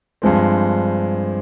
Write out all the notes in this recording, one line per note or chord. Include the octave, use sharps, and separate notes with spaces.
G2 F3 G#3 C4